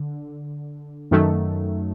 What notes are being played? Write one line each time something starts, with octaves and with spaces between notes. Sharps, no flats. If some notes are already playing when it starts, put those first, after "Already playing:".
Already playing: D3
F#2 D#3 F#3 A3